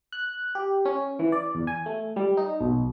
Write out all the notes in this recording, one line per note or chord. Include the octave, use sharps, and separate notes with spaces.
F#6
G4
C#4
E3
D5
E2
G#5
A3
G3
D#4
B1